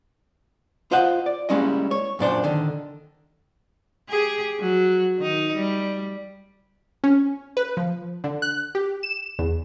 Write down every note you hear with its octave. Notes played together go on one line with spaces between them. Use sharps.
F4 C5 D#5 F5 F#5
D5
G3 G#3 A#3 C#4 E4 D#5
C#5
F#2 A#2 D4 C5
D3 D#3
G4 G#4
F#3
D#3 D#4
G3
C#4
B4
F3
D3
F#6
G4
E7
E2